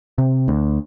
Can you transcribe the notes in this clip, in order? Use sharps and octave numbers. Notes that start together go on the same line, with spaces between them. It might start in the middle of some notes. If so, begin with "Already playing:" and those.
C3
D2